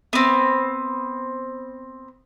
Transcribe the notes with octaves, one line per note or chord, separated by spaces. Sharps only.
B3 C4